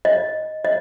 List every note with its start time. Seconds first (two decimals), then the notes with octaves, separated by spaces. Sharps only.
0.05 D#5
0.65 D#5